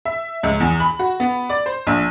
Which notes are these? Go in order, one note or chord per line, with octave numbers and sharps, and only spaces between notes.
E5
C#2
E2
B5
F#4
B3
D5
C5
A#1